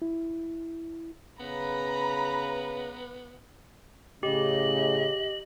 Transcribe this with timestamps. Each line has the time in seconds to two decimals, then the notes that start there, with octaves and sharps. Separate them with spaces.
0.02 E4
1.40 C#3 B3 B4 A#5 B5
4.23 A2 C#3 G4 D#5 F#7